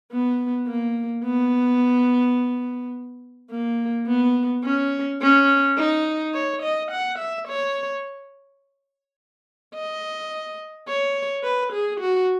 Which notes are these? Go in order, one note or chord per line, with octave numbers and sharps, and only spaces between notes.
B3
A#3
B3
A#3
B3
C#4
C#4
D#4
C#5
D#5
F#5
E5
C#5
D#5
C#5
B4
G#4
F#4